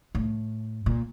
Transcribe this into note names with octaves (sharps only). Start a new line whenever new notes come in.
A2
A#2